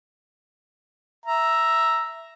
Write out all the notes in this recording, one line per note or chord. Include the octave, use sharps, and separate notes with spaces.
E5 A#5